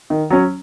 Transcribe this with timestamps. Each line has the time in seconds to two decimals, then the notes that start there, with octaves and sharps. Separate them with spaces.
0.10 D#3
0.30 F#3 C#4